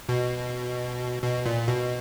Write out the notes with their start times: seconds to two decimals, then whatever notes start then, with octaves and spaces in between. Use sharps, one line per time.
0.09 B2
1.22 B2
1.46 A#2
1.68 B2